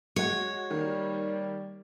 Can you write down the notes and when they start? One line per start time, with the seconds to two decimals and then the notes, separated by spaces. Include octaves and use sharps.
0.16 G#3 F#4 C#5
0.71 D#3 G3 A#3